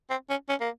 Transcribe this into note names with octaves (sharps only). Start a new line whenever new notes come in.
C4
C#4
C#4
A#3